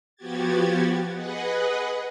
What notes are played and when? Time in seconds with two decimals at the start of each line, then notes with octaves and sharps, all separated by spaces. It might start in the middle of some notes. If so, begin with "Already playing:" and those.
0.16 F3 B3 F#4 G4 G#6 A6
1.12 G#4 B4 D#5 F#5